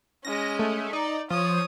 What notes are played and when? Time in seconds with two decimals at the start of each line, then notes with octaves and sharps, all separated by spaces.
0.25 G#3 C#4 A#6
0.59 A3
0.93 D#4 D5
1.30 F3 C#5 D#6